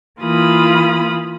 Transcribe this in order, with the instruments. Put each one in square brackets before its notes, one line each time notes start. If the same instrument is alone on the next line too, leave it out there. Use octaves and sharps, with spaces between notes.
[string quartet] E3 A#3 F4 B5 D#6